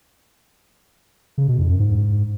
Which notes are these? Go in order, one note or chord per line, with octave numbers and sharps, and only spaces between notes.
C#3
B2
F2
F#2
G#2